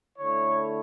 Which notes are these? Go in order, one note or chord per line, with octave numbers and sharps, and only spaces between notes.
D3 A3 E4 C#5